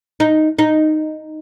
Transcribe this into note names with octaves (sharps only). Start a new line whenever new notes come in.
D#4
D#4